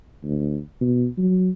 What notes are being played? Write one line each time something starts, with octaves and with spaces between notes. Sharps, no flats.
D2
B2
F#3